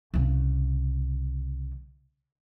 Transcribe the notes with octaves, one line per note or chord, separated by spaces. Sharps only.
C2 C#3